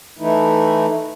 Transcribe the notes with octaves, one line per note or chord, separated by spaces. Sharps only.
E3 A3 D#4 E4